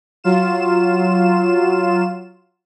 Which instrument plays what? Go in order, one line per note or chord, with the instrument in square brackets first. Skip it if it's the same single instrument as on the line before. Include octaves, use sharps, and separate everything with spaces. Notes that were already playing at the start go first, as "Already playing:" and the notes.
[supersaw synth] F#3 F4 E7